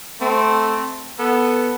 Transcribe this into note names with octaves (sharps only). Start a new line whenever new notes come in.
A3 C4
B3 A4